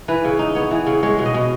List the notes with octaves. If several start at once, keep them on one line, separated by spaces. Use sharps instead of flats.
E3 B4
C#3
D#4
B3 C#5
E3
C#3
G#3 C#5
B2
D#5
B2